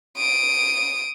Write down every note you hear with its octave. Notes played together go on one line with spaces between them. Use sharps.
D#6 D7